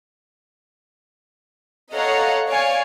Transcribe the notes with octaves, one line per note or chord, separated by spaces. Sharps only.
A4 C#5 D#5 F5 F#5 A#5
C#5 D5 F5 G#5